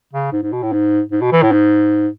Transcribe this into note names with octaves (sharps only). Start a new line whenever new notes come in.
C#3
G#2
G#2
B2
A2
G#2
G#2
B2
E3
A2
G#2